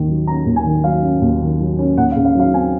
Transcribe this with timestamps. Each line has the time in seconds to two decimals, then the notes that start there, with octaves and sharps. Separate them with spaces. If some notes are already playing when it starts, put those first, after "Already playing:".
Already playing: D#2 D#3
0.08 F#3
0.27 C#4 A#5
0.46 D#2
0.56 G#5
0.64 D#3
0.84 F#3 F5
1.02 C#4
1.21 D#2
1.40 D#3
1.59 F#3
1.79 C#4
1.97 D#2 F#5
2.12 F5
2.16 C#3
2.25 F5
2.35 F#3 F5
2.54 C4 G#5